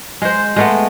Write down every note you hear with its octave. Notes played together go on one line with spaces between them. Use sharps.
G#3 C5
G#3 A3 B3